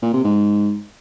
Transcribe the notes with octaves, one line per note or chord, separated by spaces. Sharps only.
A#2
C3
G#2